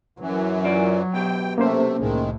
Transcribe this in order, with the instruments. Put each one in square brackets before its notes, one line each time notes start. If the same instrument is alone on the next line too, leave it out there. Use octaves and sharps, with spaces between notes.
[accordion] F#2 E3 [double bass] F#3
[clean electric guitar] F4 D5
[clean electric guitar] B2 G4 [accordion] G5
[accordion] C3 A3 [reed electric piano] A#3 C#4 C5
[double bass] C2 A2 [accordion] D#3 G#3